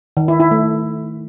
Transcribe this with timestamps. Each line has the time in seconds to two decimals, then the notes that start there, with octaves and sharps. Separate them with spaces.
0.17 D#3
0.28 E4
0.40 E4
0.51 A3